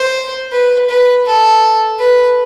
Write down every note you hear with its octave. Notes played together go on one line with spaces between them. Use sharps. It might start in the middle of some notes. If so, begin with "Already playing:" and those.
Already playing: C5
B4
B4
A4
B4